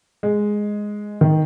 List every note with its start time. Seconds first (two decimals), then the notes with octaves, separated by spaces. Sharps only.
0.23 G#3
1.21 D#3